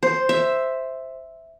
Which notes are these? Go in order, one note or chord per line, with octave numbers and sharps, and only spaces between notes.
C5
E5